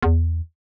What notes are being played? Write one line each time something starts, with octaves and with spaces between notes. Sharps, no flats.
E2